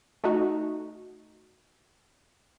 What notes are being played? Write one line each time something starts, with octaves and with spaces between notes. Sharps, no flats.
A3 D#4 F#4